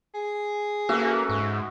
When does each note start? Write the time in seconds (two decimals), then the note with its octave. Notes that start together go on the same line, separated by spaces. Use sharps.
0.14 G#4
0.89 A#3 C#4 F#4 A4 B4 E5
1.29 G#2